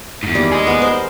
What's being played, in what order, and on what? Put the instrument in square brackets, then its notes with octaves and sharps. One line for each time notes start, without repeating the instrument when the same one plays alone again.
[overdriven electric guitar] E2 G#2
[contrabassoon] D#2 [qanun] G3
[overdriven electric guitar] G#4 D#5
[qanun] B3 A#4
C5